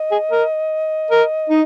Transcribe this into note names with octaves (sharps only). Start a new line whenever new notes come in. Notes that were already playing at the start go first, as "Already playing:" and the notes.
Already playing: D#5
G#4
A#4
A#4
D#4